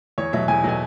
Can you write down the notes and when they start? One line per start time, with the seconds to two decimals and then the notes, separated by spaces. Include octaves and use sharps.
0.18 E2 C#5
0.33 B2 F#3 E5
0.48 E2 G#5
0.64 B2 F#3 G#5